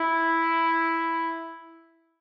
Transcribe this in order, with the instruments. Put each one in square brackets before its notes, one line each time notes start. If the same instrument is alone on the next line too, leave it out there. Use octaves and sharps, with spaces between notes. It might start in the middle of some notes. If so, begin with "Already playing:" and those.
Already playing: [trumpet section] E4